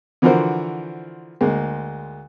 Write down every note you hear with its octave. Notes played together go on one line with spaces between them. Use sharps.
D3 E3 F3 F#4 A#4 C5
D2 G#3 A#3